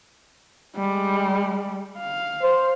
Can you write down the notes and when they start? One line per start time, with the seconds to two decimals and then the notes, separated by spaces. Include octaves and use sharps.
0.77 G3 G#3
1.98 F5
2.43 C5